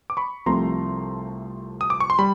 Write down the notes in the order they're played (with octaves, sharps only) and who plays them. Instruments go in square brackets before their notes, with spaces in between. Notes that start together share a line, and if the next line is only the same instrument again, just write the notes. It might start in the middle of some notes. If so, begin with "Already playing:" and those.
[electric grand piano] D6
B5 C#6
C2 C3 F3 A3 A#5 C6
D#6
D6
C#6
C6
G3 B5